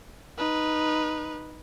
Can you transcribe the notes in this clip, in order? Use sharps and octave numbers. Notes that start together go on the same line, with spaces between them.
D#4 B4